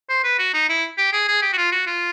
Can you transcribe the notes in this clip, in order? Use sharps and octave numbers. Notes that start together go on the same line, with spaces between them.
C5
B4
F#4
D#4
E4
G4
G#4
G#4
G4
F#4
F4
F#4
F4